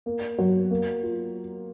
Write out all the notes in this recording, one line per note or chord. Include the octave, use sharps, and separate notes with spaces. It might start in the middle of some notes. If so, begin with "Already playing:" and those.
A#3
F#3
A#3
F4